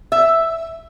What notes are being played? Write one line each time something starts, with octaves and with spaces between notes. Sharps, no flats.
E5